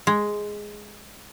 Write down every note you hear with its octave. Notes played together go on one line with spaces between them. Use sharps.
G#3